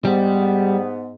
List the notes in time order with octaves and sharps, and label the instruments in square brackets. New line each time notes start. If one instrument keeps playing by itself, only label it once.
[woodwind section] G#2 B3 [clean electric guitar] G3